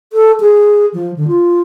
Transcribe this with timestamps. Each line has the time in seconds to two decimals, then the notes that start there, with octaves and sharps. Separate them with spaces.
0.13 A4
0.40 G#4
0.94 F3
1.17 D3
1.28 F4